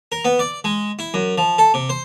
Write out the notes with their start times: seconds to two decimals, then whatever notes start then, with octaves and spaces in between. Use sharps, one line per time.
0.12 A#4
0.25 B3
0.39 D5
0.64 G#3
0.99 E4
1.14 F#2
1.38 F3
1.58 A4
1.74 C3
1.89 C5